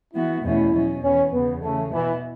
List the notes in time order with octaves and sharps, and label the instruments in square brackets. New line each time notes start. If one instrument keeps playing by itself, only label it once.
[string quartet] E3 B3 F#4 [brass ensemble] E4
[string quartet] E2 B2 A3 C#4 [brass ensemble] E4
[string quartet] B2 F#3 C#4
[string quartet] E2 E3 B3 [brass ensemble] C#4
[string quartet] E2 C#3 E3 [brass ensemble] B3
[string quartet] C#3 E3 C#4 [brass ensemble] A3
[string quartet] B2 B3 E4 [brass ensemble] E3